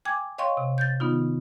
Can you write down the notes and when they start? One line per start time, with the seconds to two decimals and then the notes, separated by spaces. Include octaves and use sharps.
0.05 G5 G#5 D6 G#6
0.38 C#5 D#5 F5 G5 C6 C#6
0.57 C3
0.78 G6 A6
1.00 D#3 B3 D#4 F4